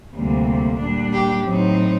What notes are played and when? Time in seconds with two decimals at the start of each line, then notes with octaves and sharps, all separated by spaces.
0.15 D2 C3 G3 A#3
0.80 A#2 G3 D4
1.12 G4
1.45 A2 F#3 C4 D#4